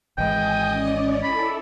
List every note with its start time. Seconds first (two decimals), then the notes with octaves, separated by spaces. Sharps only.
0.18 G#1 E3 G#3 D#5 G5 G#5 D#6
0.67 C#4 D5
1.23 E4 A4 B5